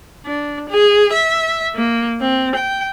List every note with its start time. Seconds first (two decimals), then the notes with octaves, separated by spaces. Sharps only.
0.26 D4
0.69 G#4
1.13 E5
1.75 A#3
2.21 C4
2.55 G5